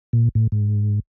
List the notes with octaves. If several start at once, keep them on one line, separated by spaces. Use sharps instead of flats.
A#2
A2
G#2